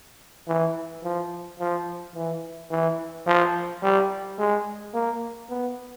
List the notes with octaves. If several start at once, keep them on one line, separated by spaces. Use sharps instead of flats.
E3
F3
F3
E3
E3
F3
G3
G#3
A#3
B3